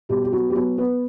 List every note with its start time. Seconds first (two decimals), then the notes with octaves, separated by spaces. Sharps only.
0.09 B2 G3 G4
0.24 G4
0.32 F#3 B3 F#4
0.50 G4
0.55 F#3 B3 F#4
0.78 B3 B4